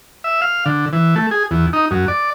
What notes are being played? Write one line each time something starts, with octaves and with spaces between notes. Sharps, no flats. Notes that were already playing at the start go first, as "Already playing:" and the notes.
E5
F5
D3
E3
A3
G#4
E2
D#4
F#2
D5